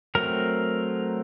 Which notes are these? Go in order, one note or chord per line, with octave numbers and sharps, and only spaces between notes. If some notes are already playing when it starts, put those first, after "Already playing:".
F#3 A3 C4 A#4